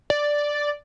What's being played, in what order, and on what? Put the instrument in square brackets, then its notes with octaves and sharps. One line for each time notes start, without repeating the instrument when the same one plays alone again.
[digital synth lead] D5